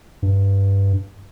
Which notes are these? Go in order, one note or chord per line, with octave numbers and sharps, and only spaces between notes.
G2